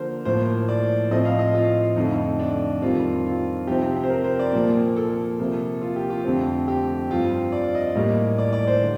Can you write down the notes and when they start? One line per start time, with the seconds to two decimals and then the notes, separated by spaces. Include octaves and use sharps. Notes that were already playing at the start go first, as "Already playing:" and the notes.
Already playing: D3 F3 A#3 A#4 C5
0.25 A2 F3 A#3 C5
0.68 D5
1.11 A2 F3 A3 C4 D#5
1.25 F5
1.39 D#5
1.54 F4
1.96 F2 D3 A3 D#4
2.39 D4
2.82 F2 D#3 G3 C4 F4
3.26 F4
3.67 C3 F3 C4 G4
3.83 G4
3.96 G4
4.04 C5
4.10 A#4
4.24 C5
4.39 D5
4.53 A#2 F3 A#3
4.96 A4
5.38 C3 F3 A#3
5.82 F4
5.96 G4
6.10 F4
6.24 F2 D3 A3 C4 G4
6.68 G4
7.10 G2 F3 C4 F4
7.52 D5
7.75 D#5
7.95 A2 G3 A#3
8.38 D5
8.53 D5
8.67 C5
8.81 D3